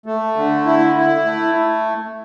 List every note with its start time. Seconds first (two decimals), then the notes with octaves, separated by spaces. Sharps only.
0.06 A3
0.36 D3
0.66 E4
0.96 E4
1.25 A3